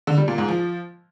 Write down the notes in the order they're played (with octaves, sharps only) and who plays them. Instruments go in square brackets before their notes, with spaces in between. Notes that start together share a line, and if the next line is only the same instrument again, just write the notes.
[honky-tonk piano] D3
G3
A#2
G#2
F3